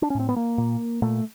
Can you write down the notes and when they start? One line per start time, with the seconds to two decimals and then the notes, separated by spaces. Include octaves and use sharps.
0.02 D4
0.10 C#4
0.15 A2 C4
0.29 B3
0.36 A#3
0.58 A#2
1.02 A#2 A3